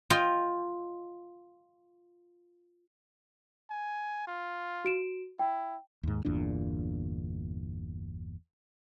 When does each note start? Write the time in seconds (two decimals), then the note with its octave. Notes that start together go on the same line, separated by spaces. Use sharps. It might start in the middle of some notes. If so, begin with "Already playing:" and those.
0.10 F4 D#5 G5
3.70 G#5
4.27 F4
4.85 F#4 D7 E7
5.39 E4 G5
6.03 D#2 G#2
6.25 G1 E2 A#2 D4